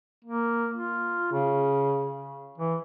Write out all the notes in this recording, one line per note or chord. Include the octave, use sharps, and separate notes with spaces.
A#3
F4
C#3
E3